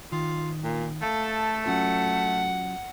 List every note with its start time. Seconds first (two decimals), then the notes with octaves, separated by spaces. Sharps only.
0.12 D#3 F4
0.63 A#2
1.02 A3 A4 F5
1.66 F#3 C#4 F4 F#5